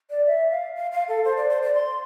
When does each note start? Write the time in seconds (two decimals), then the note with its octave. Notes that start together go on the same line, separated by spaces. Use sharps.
0.10 D5
0.27 E5
0.51 F5
0.76 F5
0.92 F5
1.08 A4
1.25 C5
1.37 D5
1.50 C5
1.62 D5
1.74 C6